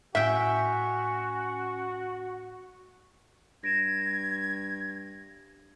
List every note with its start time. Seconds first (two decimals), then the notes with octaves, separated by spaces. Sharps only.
0.15 A2 C#4 F#4 E5 G5
3.64 G2 G#6 A#6 D7 E7